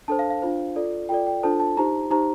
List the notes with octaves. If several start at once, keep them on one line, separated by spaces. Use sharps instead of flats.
D4 A4 C5 A5
F5
F5
D4 F4 C5
F4 A4 D5
F4 A4 D5 G5
G5
D4 F4 A4 C5 A5
A5
D#4 G4 C5 A#5
D#4 G4 C5 A#5